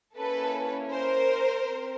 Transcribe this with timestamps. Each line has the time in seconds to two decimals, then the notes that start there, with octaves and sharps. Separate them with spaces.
0.16 A#3 C#4 E4 A4 B4
0.91 A#4 C5
1.66 C4